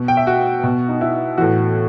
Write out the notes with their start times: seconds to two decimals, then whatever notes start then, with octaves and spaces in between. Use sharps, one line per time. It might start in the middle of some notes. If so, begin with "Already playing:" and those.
Already playing: B2
0.08 G5
0.17 E5
0.27 F#4
0.64 B2
0.89 D#4
1.01 E4
1.38 A2 E3 F#4